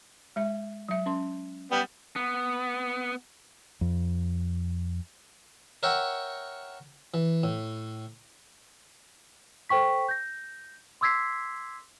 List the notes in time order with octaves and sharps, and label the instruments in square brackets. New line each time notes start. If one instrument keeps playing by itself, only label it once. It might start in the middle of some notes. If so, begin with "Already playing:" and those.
[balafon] G#3 E5
F#3 E5
C#4 C6
[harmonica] G3 B3
[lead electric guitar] B3
[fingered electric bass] F2
[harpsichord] A#4 C#5 E5 F#5 G5
E3
A2
[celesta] A4 C5 G5 C#6 B6
G6 A#6
C6 D6 E6 G#6 B6 C7